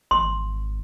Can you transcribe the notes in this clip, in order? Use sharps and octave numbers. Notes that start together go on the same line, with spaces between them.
G#1 C6